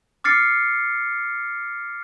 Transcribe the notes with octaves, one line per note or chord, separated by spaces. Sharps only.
D6 F6 A6 C7 C#7